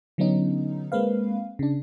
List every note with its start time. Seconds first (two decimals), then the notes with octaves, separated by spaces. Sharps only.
0.18 D3 F#3 B3 C#4 D#4
0.92 G#3 A#3 C4 B4 F5
1.59 C#3 D4